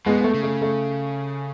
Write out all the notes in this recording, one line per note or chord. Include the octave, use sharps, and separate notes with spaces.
B2 G#3 B3
B3
A3
C#3
A3
A3